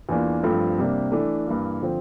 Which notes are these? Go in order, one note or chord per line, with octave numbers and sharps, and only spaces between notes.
E2 E3 A#3 D4 F4
G2 F3 A3 C4
C3 G3 A#3 D4
E3 A3 D4
G2 E3 A#3
D3 F3 C4